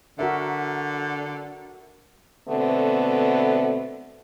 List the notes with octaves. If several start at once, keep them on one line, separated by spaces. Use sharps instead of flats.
D3 F#4 A#4 E5
B2 D3 A3 B3 C4